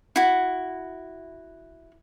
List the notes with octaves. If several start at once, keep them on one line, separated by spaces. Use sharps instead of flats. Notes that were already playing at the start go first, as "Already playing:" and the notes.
E4 F#4